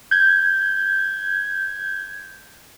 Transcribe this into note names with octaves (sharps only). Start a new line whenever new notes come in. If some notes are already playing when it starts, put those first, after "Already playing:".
G6 G#6